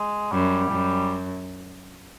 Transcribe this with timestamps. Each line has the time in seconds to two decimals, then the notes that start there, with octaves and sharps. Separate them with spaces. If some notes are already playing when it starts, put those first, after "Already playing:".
Already playing: G#3
0.32 F#2 G3
0.72 F#2